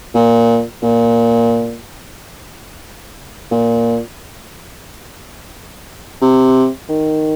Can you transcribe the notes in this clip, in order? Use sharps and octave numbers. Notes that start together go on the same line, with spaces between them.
A#2
A#2
A#2
C3
D#3